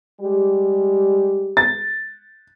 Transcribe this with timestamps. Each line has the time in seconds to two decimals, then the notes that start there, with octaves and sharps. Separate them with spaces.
0.21 G3 G#3 G4
1.57 A6